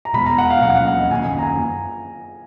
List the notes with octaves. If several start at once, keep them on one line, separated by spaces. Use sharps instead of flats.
A#5
B2 G#3 B3 B5
A#5
F#5
F5
B2 F#3 A#3 C#4 F#5
F#5
F#5
D#5
F#2 D#3 A#3 C#4 G#5
A#5
G#5